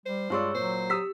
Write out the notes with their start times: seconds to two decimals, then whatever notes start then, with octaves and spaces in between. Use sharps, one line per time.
0.06 G3 C5
0.30 G2 G#3 F4 C#5 D5 C#6 E6
0.55 A#2 F#3 C5
0.90 G4 D#6 E6 B6